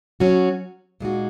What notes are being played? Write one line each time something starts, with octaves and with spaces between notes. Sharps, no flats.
F#3 C#4 F#4
A#2 G#3 D#4 F#4